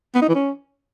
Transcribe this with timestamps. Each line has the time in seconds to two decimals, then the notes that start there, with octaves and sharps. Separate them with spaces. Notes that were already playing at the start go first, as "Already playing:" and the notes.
0.15 B3
0.22 D#4
0.28 E3
0.35 C#4